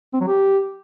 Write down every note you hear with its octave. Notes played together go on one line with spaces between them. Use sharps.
C4
F#3
G4